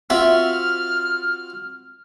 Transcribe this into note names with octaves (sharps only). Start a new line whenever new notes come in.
C4 F4 F#4 E5 F6